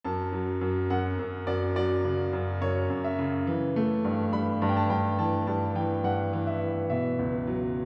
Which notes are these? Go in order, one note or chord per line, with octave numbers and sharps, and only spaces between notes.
F#2 A5
F#3
F#2
F#2 F#5
F#2
F#2 D5
F#3 D5
C#3
F#2
F#2 C#5
F#2
E5
C#3
E3
A3
G2
G2 B5
G2 A5
G5
A5
G2 G5
E3 A5
G2 A5
E3 G5
G2 F#5
E3
E5
E3
B2 E5
C#2
F#3